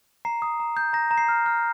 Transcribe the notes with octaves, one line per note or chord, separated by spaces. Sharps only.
A#5 C7
D#6
A#5
G6
A#5 A#6
A#5
C7
F6
F6